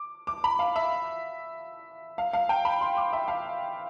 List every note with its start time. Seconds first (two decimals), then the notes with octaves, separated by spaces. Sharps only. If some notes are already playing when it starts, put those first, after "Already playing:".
Already playing: D6
0.27 D6
0.44 B5
0.59 F5
0.76 E5
2.18 F5
2.33 F5
2.49 G5
2.65 B5
2.81 C6
2.97 D6
3.13 E5
3.28 F5